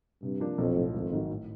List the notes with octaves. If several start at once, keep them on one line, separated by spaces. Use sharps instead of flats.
G2 C3
F3 A#3 D4
B1 F2
A2 F3
G#1 F2
G#2 D#3 F#3
A2